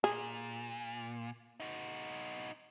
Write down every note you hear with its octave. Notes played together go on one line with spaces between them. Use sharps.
A#2 G#4
D#4 F#4